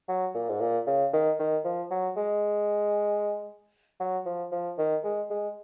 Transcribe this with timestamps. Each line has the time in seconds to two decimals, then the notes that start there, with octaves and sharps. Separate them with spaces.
0.09 F#3
0.35 A#2
0.50 G#2
0.61 A#2
0.87 C#3
1.13 D#3
1.40 D#3
1.65 F3
1.91 F#3
2.17 G#3
4.00 F#3
4.26 F3
4.52 F3
4.78 D#3
5.04 G#3
5.31 G#3